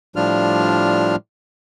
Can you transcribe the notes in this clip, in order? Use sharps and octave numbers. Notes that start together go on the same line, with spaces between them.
A2 F3 G3 D4 F4 F6